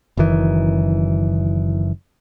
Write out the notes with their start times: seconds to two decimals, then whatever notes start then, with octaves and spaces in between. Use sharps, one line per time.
0.17 F#1 F#2 D#3 E3